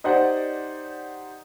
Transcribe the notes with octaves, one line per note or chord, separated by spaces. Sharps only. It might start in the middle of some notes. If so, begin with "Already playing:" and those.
D#4 G4 C5 D5 F#5